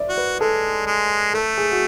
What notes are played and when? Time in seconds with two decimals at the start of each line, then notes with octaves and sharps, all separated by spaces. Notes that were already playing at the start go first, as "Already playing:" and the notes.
Already playing: D5 E5
0.09 F#4
0.17 B4
0.40 G#3 A4
0.87 G#3
1.34 A3 A4
1.58 G#4
1.72 F#4